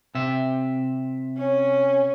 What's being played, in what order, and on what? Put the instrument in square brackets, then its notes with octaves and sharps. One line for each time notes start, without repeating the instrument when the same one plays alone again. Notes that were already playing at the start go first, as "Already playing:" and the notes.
[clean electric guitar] C3 E5
[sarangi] C#4